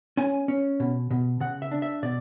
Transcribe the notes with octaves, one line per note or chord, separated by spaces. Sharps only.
C#4 G#5
C#4
B2
B2
C#3 F#5
E5
D4
E5
B2 D5